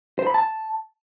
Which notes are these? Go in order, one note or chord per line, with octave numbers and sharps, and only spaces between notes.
C5
B5
A5